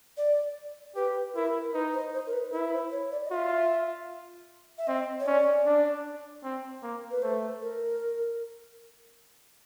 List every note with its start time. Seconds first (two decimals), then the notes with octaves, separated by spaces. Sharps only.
0.17 D5
0.95 G4 B4
1.35 E4 A#4
1.74 D#4 B4
1.94 C5
2.14 C5
2.27 A#4
2.33 B4
2.53 E4 B4
2.73 C5
2.91 C#5
3.11 D5
3.25 D#5
3.31 F4 E5
4.78 E5
4.87 C4 D#5
5.20 C#5
5.26 C#4 D5
5.66 D4
6.44 C4
6.83 A#3
7.11 B4
7.22 A3 C5
7.62 A#4